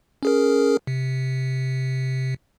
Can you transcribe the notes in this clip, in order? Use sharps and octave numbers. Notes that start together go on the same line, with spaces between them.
C#4 G#4 A#4
C3